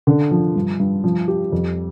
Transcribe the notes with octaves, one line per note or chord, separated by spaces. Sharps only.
D3
F3
G2
G2
F3
G4
F2